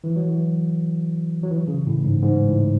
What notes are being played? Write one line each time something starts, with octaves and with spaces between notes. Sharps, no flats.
E3
F#3
E3
F#3
E3
C#3
A2
G#2
G#2
A2